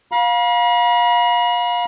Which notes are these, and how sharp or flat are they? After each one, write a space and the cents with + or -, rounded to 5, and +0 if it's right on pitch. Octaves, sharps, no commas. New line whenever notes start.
F5 +20 B5 -45